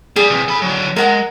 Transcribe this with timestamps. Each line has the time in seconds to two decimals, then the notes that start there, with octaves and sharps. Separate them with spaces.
0.16 G3 G#4
0.30 E2 C3
0.48 A4 B5
0.62 D3 F#3
0.96 G#3 A#4 F#5 A#5